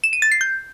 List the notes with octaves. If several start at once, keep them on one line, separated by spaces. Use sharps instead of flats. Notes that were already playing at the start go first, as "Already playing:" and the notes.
E7
D#7
A6
C7
G6